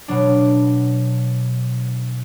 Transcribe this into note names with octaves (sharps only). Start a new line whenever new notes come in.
B2 F#3 D4